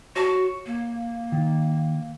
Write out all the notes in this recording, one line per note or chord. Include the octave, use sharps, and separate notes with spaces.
F#4 C#5 A5
A#3
D#3